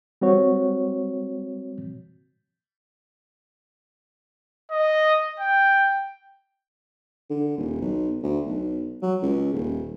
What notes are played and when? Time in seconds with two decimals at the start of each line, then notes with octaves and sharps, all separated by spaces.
0.21 G3 C4 F#4 C#5
4.71 D#5
5.40 G5
7.30 D3
7.57 D#1
7.80 B1
8.23 D2
8.46 B1
9.02 F#3
9.22 C#2
9.53 D#1